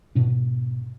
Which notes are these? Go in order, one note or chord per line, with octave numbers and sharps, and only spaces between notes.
G#2 B2 D4